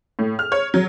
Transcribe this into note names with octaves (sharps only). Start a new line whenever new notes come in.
A2
F6
C#5
F#3